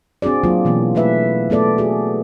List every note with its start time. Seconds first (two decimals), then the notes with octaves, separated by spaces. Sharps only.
0.22 C4 D4 F#4 G#4 D5
0.44 F#3 A#3 F4
0.65 B2 E3 A#3 B3
0.95 A3 E4 B4 E5
1.50 A3 B3 A4 D5
1.78 F#4 G#4